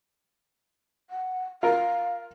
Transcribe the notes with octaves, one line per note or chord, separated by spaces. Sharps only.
F#5
F4 A#4 F5